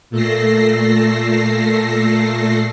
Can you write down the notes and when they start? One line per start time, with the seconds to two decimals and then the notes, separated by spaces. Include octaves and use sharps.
0.10 A#2 A3 A4 A#6 C7